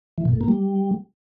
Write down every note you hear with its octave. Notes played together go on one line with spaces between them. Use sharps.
E3
A#2
A2
A#3
G3